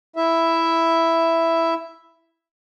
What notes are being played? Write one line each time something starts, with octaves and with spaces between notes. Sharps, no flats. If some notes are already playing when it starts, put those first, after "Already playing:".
E4 E5